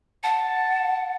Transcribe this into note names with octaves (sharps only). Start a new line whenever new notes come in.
F#5 A5